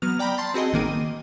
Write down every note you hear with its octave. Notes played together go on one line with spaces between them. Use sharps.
F#3 B3 F6
D5 G5 A#5 B5
A5 C6
C4 F#4 G#4 D#5
A1 D#3 A#3 D#7